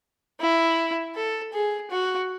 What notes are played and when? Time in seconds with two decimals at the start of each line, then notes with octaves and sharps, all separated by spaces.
0.41 E4
1.16 A4
1.53 G#4
1.91 F#4